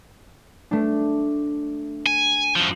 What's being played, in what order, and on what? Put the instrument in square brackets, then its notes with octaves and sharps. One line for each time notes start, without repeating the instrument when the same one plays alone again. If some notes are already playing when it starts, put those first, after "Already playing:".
[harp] A3 D4
[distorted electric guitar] G#5
F#2 F3